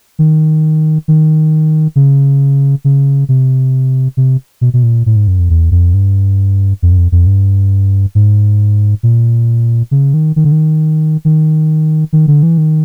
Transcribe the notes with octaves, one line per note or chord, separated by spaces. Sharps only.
D#3
D#3
C#3
C#3
C3
C3
B2
B2
A#2
A2
G#2
F#2
F2
E2
F2
G2
F2
F#2
F2
F2
G2
G#2
A#2
C#3
D#3
D#3
D3
D#3
D#3
D#3
D3
E3
D#3